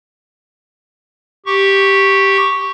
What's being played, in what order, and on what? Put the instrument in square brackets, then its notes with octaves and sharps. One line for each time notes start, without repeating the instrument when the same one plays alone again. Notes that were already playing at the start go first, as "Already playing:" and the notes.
[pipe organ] G4 C#6